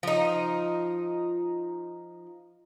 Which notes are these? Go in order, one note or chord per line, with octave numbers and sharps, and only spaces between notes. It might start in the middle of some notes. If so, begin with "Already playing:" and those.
F3 D#4